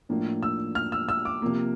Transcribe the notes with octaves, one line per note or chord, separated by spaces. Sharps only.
A2 F3 A#3 D4
E6
F6
E6
E6
D6
C3 F3 A#3